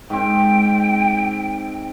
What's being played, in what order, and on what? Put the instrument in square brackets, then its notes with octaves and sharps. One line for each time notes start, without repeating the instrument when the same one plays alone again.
[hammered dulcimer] G#2 C4 [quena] G5